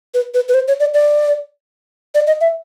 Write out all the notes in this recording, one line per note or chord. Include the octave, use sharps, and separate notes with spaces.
B4
B4
B4
C5
C#5
D5
D5
D5
D#5
E5